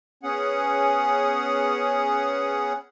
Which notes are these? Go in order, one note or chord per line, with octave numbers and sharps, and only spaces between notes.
B3 C#4 G#4 F#5